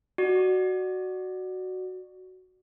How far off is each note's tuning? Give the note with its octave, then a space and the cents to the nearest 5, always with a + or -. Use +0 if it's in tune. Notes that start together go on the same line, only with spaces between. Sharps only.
F#4 +5 D5 +25